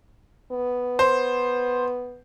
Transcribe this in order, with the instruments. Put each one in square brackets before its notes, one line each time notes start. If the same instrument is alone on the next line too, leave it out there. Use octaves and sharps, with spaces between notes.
[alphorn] B3
[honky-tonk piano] C5